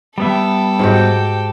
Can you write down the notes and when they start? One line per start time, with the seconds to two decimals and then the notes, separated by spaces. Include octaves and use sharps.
0.18 G3 B3 A4 E5 G5
0.79 G#2 F#4 G4